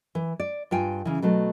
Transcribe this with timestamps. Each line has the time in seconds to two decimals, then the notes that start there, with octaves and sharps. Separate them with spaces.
0.15 E3
0.40 D5
0.71 G2 F4 G5 G#5
1.05 C#3 E3
1.22 B2 F#3 A3